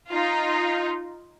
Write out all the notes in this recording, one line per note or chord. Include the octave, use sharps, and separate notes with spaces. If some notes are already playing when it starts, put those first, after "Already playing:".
D#4 F4